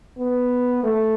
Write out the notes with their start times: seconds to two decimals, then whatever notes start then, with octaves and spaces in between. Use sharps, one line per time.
0.18 B3
0.83 A3